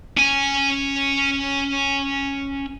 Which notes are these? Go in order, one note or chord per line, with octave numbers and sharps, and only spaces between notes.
C#4 G#5